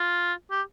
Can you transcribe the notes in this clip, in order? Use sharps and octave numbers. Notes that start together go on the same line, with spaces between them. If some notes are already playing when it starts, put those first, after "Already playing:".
Already playing: F4
G4